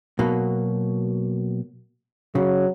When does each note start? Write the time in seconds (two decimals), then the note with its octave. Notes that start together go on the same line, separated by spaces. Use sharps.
0.19 B2 F#3 A#3
2.35 C#3 F#3